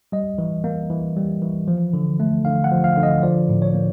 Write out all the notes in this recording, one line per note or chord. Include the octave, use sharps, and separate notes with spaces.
G3 D#5
E3
A#3
E3
G3
E3
F3
D3
A3
D3 F5
F#5
F3
F5
D3
D#5
F3 D5
A2
C#5
A#3